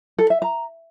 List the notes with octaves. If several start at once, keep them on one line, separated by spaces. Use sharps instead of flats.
A4
E5
A#5